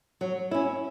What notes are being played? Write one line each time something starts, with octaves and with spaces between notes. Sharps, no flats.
F#3
C#4 E4